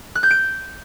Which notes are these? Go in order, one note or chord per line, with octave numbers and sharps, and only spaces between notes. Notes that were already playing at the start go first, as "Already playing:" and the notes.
F#6
G6
D7